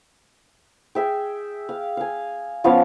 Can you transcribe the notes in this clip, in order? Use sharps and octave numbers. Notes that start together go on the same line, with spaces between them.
G#4 E5 G5
F5
F5 G#5
F3 B3 C#4 F5